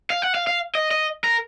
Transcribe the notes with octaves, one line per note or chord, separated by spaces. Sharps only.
F5
F#5
F5
F5
D#5
D#5
A#4